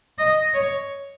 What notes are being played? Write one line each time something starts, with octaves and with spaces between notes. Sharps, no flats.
D#5
C#5